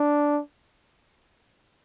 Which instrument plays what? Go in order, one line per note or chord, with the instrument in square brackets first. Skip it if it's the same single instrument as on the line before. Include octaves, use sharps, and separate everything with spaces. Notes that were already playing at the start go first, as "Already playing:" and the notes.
Already playing: [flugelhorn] D4